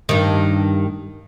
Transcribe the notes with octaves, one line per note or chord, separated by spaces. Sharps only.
G2 D#3